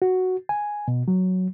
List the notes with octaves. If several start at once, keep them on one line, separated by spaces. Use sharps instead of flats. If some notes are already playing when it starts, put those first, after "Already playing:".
F#4
G#5
B2
F#3